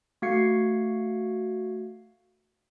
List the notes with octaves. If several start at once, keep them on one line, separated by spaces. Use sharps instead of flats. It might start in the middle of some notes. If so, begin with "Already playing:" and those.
A3 F#4 F5 G#6 C7 C#7